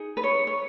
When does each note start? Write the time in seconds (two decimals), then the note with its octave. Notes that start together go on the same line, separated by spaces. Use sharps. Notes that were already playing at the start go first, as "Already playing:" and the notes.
Already playing: D#4 G#4
0.17 B4
0.23 C#5
0.47 C#5